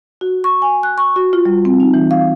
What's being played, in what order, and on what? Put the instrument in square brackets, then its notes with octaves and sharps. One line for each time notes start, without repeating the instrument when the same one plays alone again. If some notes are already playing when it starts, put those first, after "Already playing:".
[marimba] F#4
C#6
G#5
F#6
C#6
F#4
F4
G3
C4
D#4
E3
F5